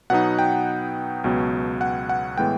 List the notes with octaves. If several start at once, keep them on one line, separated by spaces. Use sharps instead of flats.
B2 F#3 B3 D#4 F#5
G5
C#2 B2 F#3 B3
F#5
F#5
A2 E3 G#3 B3 G5